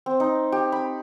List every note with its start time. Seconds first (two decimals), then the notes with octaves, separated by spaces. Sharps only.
0.06 C4
0.20 D#4
0.52 G4
0.72 B5